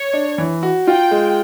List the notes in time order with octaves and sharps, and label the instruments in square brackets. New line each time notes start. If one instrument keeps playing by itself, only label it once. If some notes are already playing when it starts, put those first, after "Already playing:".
Already playing: [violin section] C#5
[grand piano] D4
E3
F#4
[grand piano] F4 [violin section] G5
[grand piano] G#3